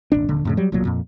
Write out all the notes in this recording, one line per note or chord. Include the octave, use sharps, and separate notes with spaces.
D#1 G#1 D4
D#1 D3
F2 A2 C#3
F#3 G3
D#1 B1 A#2 F#3
F2 A#2